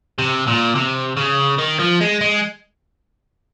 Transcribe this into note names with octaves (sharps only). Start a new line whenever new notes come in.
C3
A#2
C3
C#3
D#3
F3
G#3
G#3